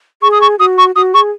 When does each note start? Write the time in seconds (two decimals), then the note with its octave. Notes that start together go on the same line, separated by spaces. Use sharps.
0.22 G#4 C#6
0.32 D#6
0.41 C#6
0.59 F#4 D#6
0.78 C#6
0.95 F#4 D#6
1.14 G#4 C#6